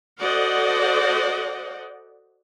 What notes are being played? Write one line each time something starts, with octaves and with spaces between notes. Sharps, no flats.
F#4 A4 C5 D5 D#5 F#5